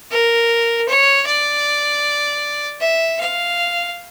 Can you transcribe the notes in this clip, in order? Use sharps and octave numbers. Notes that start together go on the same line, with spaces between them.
A#4
C#5
D5
E5
F5